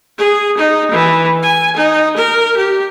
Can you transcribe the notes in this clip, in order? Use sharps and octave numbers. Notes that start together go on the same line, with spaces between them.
G#4
D#4
E3
G#5
D#4
A#4
G4